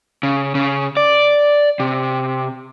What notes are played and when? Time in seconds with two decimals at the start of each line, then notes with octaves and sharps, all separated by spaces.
0.23 C#3
0.55 C#3
0.97 D5
1.80 C3